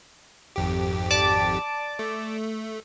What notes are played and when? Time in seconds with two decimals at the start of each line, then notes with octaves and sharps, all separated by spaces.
0.56 G#1 F2 G4
1.10 D5 A5 D6
1.99 A3